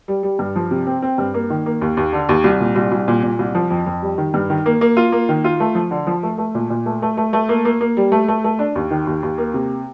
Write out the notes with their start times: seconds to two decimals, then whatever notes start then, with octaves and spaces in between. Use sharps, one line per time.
0.08 G3
0.23 G3
0.39 G2
0.56 F3
0.71 C3
0.87 C4
1.02 C4
1.18 G2
1.34 A#3
1.50 D#3
1.66 A#3
1.82 D#2
1.97 D#2
2.13 D3
2.29 D#2
2.44 C2
2.60 A#2
2.76 C2
2.92 C2
3.08 A#2
3.23 A#2
3.39 C2
3.55 F3
3.70 F2
3.86 F2
4.02 G3
4.18 D#3
4.34 G2
4.50 D#3
4.66 A#3
4.81 A#3
4.97 F4
5.12 A#3
5.29 D#3
5.44 F4
5.60 A3
5.75 F3
5.91 D3
6.07 F3
6.23 A3
6.38 A3
6.55 A#2
6.70 A#2
6.86 A3
7.02 A3
7.17 A3
7.33 A3
7.49 A#3
7.65 A#3
7.81 A#3
7.97 G3
8.12 A3
8.28 A3
8.44 A3
8.59 D4
8.76 D#2
8.91 D#3
9.07 D#2
9.23 D#2
9.38 A#3
9.54 C3